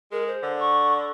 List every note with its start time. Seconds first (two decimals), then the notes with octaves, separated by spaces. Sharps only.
0.12 G#3 A#4
0.28 C5
0.43 D3
0.60 C#6